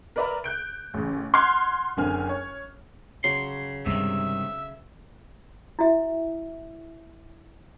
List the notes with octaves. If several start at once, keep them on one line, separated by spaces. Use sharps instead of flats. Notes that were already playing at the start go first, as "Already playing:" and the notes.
A#4 B4 D5 E5 A#5 B5
F#6 G6 D7
A1 C#3
F#5 C6 F6 F#6 G#6 C7
F#1 D3 C4 G#5 F6
C#5
C#3 F#3 C6 C#6
G2 C3 D#3 G#3 E5
E4 F#4 E5